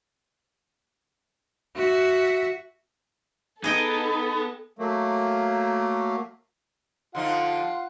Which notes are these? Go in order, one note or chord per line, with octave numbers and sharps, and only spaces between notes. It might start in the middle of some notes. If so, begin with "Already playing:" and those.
F#4 E5
B3 D#4 G#4 A4 D#5 G5
F#3 A3 A#3
D3 F3 D#4 F4 F5 F#5 C6